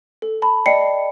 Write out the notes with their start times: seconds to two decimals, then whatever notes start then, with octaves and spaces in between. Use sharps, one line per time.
0.22 A4
0.42 A5 B5
0.66 D5 D#5 G5 C7 C#7